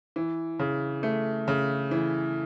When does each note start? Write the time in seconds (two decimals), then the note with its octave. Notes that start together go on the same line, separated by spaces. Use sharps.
0.16 E3
0.59 C#3
1.03 A3
1.48 C#3
1.91 E3